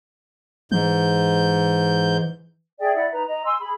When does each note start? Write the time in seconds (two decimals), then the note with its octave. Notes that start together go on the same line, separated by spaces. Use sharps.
0.72 G#2 E3 G6
2.79 G#4 D5 E5 G5
2.95 E4 D5 E5 F#5
3.12 D#4 B4 A#5
3.26 D#5 A#5
3.45 G#5 C6 E6
3.60 G#4 B5